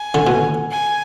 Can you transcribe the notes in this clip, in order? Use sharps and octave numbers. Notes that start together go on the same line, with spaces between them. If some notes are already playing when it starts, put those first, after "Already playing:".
Already playing: G#5
D3
B2
G#5